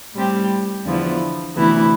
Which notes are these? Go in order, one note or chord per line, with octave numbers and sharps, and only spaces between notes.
A2 G3 C4 G4
E2 D3 F3 B3 E4
D2 C3 E3 B3 E4